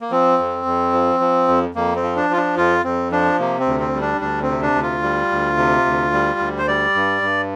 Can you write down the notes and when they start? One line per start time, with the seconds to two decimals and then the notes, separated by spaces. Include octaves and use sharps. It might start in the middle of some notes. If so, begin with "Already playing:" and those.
0.01 A#3
0.11 F3 C4
0.38 F2
0.66 F2
0.93 F3
1.20 F3
1.48 F2
1.75 F2 A#3
1.96 C4
2.02 F3
2.16 D4
2.30 F3 F4
2.37 D4
2.57 F2 F4
2.84 F2 C4
3.11 F3 D4
3.39 C3 A#3
3.60 C4
3.66 D2
3.80 C4
3.94 G3
4.01 D4
4.21 D2 D4
4.42 C4
4.49 C3
4.62 D4
4.75 D2
4.83 F4
5.03 G3
5.30 D2
5.57 C3
5.85 D2
6.13 G3
6.39 D2
6.58 C5
6.68 G3 D5
6.95 G2
7.22 G2